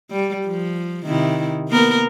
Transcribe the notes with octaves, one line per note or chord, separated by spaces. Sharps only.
G3
F3
C3 D#3 E4
A#3 B3 A#4